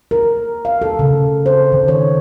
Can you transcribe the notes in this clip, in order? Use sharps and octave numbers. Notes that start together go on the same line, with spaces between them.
A#4
F5
A4
C#3
C5
D#3
C#5